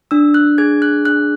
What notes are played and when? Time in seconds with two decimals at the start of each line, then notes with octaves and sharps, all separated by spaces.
0.11 D4 E6
0.34 F#6
0.58 G#4 G#6
0.82 F#6
1.05 D4 F#6